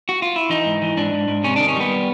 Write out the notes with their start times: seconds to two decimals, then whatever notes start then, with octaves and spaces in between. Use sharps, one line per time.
0.09 F#4
0.22 F4
0.36 E4
0.50 E3 D#4
0.65 G#2
0.82 E3
0.97 G#2 D4
1.13 G#2
1.28 G#2
1.44 C3 C#4
1.56 D#3 D4
1.68 C#4
1.76 G3 B3